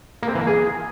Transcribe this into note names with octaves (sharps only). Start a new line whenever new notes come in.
A#3
C4
E3
A#3
G#4